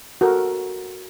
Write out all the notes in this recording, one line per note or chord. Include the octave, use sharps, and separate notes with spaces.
F#4 A4 A#4